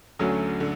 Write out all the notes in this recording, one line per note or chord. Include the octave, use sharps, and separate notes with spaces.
D2 D3 F#3 A3 C#4
D3